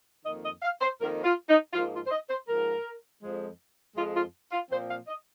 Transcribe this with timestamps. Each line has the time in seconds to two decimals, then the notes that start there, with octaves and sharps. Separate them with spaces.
0.25 F2 D#3 A#3 D#5
0.43 D#5
0.62 F5
0.81 C5
0.99 F2 D#3 A#3 A#4
1.24 F4
1.48 D#4
1.73 G#2 F3 A#3 F4
1.93 F4
2.06 C5
2.11 D#5
2.29 C5
2.47 G#2 F3 A#3 A#4
3.22 F2 F3 G#3
3.96 F2 F3 G#3 F4
4.14 F4
4.52 F4
4.70 A#2 F3 C4 C5
4.88 F5
5.07 D#5